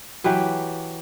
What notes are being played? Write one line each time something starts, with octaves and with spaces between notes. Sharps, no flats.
E3 F#3 G4 B4